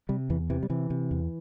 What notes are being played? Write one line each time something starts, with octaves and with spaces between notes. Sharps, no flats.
C3 G3
E2 E3
C3 E3
G3
C3 E3
C3
E2